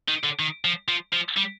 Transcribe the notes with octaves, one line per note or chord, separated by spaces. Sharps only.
D#3
D3
D#3
F3
F3
F3
G3